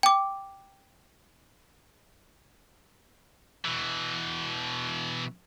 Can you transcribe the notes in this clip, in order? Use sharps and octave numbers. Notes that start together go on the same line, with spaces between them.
G5 D6
B2 E3